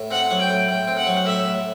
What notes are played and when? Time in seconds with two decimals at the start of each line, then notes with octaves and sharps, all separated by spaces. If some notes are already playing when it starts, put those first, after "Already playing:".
Already playing: A2
0.10 C4 F#5
0.30 F#3
0.40 G5
0.50 A2
0.68 A2 G5
0.87 C4
0.97 F#5
1.07 F#3
1.26 A2 E5
1.45 A2